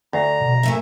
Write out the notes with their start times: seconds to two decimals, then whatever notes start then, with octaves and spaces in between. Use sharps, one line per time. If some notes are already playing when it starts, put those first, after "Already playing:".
0.13 D2 A#5
0.41 B2
0.63 A#2 A3 E5